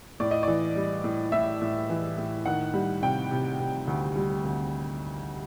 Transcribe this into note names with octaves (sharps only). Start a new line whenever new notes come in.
A2 D5
D#5
E3 D5
G3
A2
A2 E5
A2
E3
A2
D#3 F#5
G3
C3 G5
C3
C3
D2
G3
D2